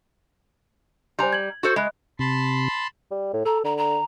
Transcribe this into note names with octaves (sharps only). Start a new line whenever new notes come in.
G3 C5 G#5 A#5 C6
G#6 F#7
F#4 A4 C5
G#3 E5 B5 F#6
C3 A5 B5 C6
G3
A2
A4 A#5
D3 A#5
A#5